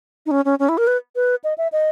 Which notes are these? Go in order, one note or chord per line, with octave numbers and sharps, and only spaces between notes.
D#4
C#4
C#4
C#4
E4
A#4
B4
B4
D#5
E5
D#5